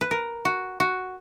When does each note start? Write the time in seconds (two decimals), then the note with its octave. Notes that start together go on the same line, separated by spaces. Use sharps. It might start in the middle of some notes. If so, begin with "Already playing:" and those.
0.01 B4
0.11 A#4
0.45 F#4
0.80 F#4